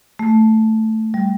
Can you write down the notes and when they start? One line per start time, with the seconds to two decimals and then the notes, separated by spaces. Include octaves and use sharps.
0.19 A3
1.14 G3